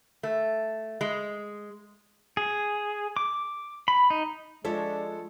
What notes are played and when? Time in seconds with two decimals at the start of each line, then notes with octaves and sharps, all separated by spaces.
0.23 A3
1.01 G#3
2.37 G#4
3.17 D6
3.88 B5
4.10 D#4
4.65 F3 G#3 D4 A4 C#5 E5